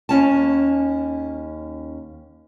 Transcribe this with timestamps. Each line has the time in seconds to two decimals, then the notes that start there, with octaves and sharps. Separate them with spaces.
0.09 D#2 C#4 A5